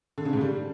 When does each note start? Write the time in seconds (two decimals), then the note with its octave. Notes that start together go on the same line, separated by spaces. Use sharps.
0.18 D3
0.25 C#3
0.33 G#2
0.41 G3